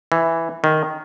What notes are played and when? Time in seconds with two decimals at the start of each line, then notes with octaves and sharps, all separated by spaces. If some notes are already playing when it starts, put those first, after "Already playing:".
0.12 E3
0.64 D#3